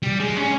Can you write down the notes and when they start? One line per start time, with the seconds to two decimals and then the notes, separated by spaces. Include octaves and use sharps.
0.03 G3
0.20 G#3
0.37 C#4